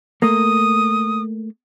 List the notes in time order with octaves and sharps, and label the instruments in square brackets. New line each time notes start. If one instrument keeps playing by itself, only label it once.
[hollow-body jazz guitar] A3 A#3 [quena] D#6